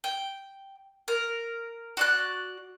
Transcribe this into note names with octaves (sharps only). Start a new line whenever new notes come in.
G5
A#4
F#4 D5 F#6